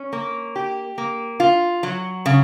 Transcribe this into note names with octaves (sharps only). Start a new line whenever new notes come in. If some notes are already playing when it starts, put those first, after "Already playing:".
Already playing: C#4
A#3
G4
A#3
F4
F#3
C#3